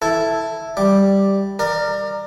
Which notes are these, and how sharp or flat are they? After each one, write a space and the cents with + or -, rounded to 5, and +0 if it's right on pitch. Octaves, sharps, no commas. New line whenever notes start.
E4 +0 A4 +0
G3 +0 D6 +5
A#4 -5 D5 +25